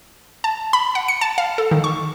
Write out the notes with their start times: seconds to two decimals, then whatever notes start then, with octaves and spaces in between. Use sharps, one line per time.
0.44 A5
0.73 B5
0.95 F#5
1.08 C#7
1.21 A5
1.38 F5
1.58 A4
1.71 D#3
1.84 C#6